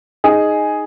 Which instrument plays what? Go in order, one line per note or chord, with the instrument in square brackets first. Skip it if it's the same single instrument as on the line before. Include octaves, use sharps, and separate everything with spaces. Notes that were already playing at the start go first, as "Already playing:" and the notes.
[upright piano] D#4 G#4